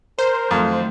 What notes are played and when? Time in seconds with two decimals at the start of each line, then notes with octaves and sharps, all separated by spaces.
0.19 A#4 C5
0.51 F2 D#3 F#3 A3